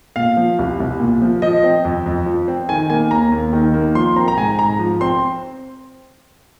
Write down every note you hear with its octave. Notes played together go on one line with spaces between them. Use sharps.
A#2 F5
F3
C2
C2
A#2
F3
F3 D#5
C4
F2
F2
F3
C4
D#3 G#5
A#3 G#5
D#2 A#5
D#2
D#3
A#3
F3 C6
C4 A#5
A#5
G#2 G#5
G#2 A#5
F3
C4 C6